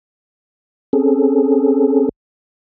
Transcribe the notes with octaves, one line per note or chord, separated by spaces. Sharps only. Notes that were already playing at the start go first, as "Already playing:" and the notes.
C4 C#4 G#4 A4